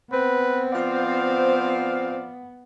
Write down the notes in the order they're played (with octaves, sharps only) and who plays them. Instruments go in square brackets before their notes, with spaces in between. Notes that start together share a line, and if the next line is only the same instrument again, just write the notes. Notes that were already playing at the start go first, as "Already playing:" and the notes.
[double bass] B3 [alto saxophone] C4 [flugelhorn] B4
[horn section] F3 D5 F5 [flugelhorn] C5